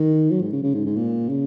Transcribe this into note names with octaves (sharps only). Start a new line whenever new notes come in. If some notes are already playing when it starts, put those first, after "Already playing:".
Already playing: D#3
F#3
G#2
C#3
C#3
G#2
G#2
A#2
C#3